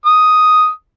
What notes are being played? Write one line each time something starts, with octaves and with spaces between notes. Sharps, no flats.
D#6